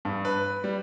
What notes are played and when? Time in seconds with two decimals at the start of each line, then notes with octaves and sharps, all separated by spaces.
0.05 G2
0.25 B4
0.64 G3